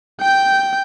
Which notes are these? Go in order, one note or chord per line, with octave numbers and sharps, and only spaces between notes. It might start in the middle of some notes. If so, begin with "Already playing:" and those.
G5 G6